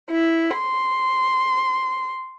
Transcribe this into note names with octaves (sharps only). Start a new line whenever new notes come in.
E4
C6